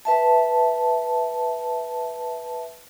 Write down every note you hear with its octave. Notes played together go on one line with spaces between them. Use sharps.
B4 E5 A5